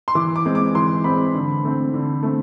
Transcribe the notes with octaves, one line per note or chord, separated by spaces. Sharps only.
C6
E3 D6
D6
G#3 C4
D6
E3 C6
G#3 C4 B5
D3
A3 C4
D3
A3 C4